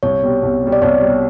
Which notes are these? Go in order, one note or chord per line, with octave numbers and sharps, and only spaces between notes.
C2 C#5
B2 G3
C2
B2 G3
D5
C2 C#5
B2 G3